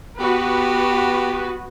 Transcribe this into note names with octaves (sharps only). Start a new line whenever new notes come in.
B3 F#4 G4 B4